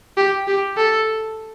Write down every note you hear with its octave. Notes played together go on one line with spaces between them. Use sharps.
G4
G4
A4